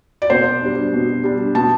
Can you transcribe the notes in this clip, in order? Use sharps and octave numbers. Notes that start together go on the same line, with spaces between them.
D5
B2 C5
G3 D4
B2
G3 D4
B2 A5